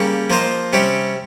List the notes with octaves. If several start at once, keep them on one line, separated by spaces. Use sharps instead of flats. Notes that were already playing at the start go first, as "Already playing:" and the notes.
Already playing: C#3 G3 A#3 C#4
F3 A#3 F4 C5 D#5
C3 G3 C#4 G4